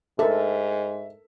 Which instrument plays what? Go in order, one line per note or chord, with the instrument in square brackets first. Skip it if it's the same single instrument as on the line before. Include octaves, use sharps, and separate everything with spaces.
[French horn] G#2 [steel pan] A4 A#4 [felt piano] E5